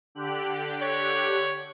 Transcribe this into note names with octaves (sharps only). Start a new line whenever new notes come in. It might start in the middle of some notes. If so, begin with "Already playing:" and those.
D3 G4 F#6
C#5